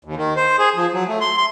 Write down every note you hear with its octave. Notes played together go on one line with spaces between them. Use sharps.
D#2
D#3
C5
G#4
F3
F#3
A3
C6
C6